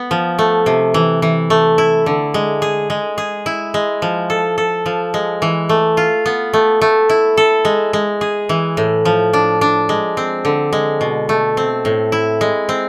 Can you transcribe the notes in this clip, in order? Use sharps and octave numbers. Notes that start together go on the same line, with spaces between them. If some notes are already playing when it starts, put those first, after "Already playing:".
Already playing: B3
F3
A3
C3
E3
E3
A3
E4
D3
G#3
G#4
G#3
G#4
E4
G#3
F3
A4
A4
F3
G#3
E3
A3
F4
B3
A3
A3
E4
A4
G#3
G#3
G#4
E3
A2
F3
D4
D4
G#3
C4
D3
G#3
B2
A3
C4
A2
E4
G#3
C4